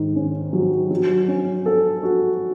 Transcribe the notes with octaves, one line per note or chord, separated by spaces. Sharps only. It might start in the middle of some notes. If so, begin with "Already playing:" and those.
Already playing: G#2 D#3
C#4
F#3
F#3
C#4
A4
F#4